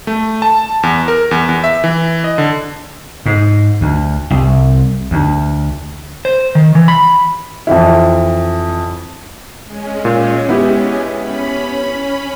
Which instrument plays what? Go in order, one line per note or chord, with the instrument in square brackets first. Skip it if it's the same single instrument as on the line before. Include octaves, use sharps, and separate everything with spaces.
[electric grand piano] A3
A5
E2
A#4
E2
E2
E5
E3
D#5
D3
[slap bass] G#2
D2
C2
D2
[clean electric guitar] C5
D#3
E3
B5
[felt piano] F2 E3 E4
[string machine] G#3 C#4
[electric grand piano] A#2
B3 E4 G4
[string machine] C#4 B5